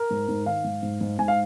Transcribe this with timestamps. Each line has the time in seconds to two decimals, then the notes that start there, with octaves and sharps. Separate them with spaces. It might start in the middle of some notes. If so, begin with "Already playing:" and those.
Already playing: A#4
0.11 G#2
0.28 G#2
0.46 D#3 F5
0.64 G#2
0.83 G#2
1.01 G#2
1.19 G#2 G#5
1.28 F5